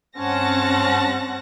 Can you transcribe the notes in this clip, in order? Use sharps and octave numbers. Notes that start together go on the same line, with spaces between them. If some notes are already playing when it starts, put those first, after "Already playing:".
G2 C4 C#4 F#5 A5 A#6